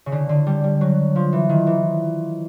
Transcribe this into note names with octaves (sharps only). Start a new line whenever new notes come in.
C#3
D3
D3
G3
G3
F#3
F3
E3
D#3
E3